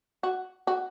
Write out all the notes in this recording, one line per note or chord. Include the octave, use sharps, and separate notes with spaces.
F#4
F#4